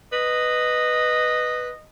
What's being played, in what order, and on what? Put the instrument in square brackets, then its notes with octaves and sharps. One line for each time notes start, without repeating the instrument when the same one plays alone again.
[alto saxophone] B4 [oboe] D#5